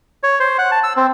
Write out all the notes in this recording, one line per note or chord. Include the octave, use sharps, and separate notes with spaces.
C#5
C5
F#5
A5
E6
C4